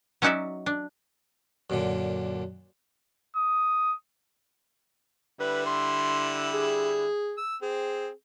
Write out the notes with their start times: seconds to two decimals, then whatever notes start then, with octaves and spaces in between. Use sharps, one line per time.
0.22 F#3 C#4 D#4 F#4 D5 E5
0.66 D4
1.70 F#2 A#2 D3
3.36 D#6
5.40 D3 G3 E4 B4
5.66 C6
6.53 G#4
7.38 E6
7.62 C4 G#4